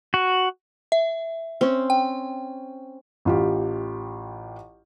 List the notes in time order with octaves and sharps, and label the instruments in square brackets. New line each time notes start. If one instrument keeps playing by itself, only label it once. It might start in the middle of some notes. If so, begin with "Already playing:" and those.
[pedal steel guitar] F#4
[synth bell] E5
[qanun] C4 C#4
[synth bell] G5
[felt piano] A1 F4 G4